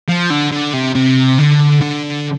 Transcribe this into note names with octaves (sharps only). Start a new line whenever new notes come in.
F3
D3
D3
C3
C3
D3
D3